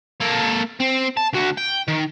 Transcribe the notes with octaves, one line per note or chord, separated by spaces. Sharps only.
A#3 A4
C4
A5
D2 F#4
G5
D#3